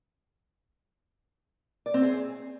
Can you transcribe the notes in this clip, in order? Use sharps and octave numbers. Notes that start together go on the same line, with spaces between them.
D5
C4
G#4